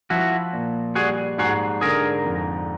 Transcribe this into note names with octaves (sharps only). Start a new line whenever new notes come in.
F3 E4 F#4
A#2
G3 F#4 G#4
G#2 F#4 G#4
D3 G#4 A#4
F2